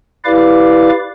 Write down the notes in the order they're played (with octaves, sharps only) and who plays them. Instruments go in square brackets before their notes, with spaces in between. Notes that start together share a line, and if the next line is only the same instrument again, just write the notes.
[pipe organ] E4 G4 B4 D5 F5 D6